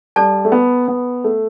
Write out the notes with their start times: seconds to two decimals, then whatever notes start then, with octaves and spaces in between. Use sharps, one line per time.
0.16 G3 A4 D5 A5
0.45 A3
0.52 B3
0.88 B3
1.24 A3